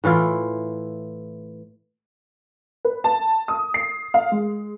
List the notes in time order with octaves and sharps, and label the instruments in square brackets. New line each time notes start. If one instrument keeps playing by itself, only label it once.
[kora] A2 E3 E4 F4
[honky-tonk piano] B4
A5
D#6
C7
F5
G#3